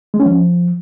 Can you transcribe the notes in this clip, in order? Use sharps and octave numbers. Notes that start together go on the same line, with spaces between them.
G#3
C#4
F3